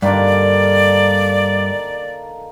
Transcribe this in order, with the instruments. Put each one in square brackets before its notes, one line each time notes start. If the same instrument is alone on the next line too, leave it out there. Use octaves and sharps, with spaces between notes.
[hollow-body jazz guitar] G2 [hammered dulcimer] D3 D#3 A#3 [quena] D5